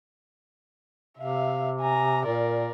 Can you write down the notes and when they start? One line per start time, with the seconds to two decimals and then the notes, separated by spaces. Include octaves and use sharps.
1.18 C3 E5 F5
1.80 G#5 A#5
2.26 A#2 A#4 D5